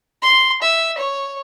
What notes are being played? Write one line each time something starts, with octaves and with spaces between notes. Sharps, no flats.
C6
E5
C#5